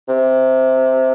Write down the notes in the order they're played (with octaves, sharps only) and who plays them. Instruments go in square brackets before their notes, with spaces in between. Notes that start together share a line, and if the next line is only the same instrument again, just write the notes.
[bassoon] C3